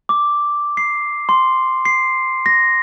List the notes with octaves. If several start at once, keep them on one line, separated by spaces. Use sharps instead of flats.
D6
C7
C6
C7
A#6